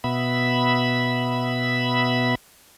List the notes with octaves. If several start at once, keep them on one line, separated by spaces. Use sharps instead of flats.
B2 B3 E5 B5